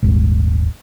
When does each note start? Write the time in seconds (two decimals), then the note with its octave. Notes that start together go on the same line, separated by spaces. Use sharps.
0.03 D#1 G#1